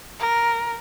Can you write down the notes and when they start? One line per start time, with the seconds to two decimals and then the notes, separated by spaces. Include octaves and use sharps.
0.20 A#4